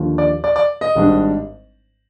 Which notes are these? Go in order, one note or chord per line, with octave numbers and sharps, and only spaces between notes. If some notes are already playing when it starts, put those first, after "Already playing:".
Already playing: D#2 D3 F3
D5
D5
D5
D#5
G#1 G#2 G3 D4